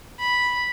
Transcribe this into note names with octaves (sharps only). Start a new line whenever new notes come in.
B5